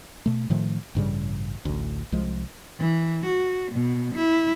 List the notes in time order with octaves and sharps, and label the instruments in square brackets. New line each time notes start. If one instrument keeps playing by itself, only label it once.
[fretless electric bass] B2 A3
A2 D#3 F3 A3
A1 G2 C#3 G3
A1 D2
C2 F3 G#3
[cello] E3
F#4
B2
E4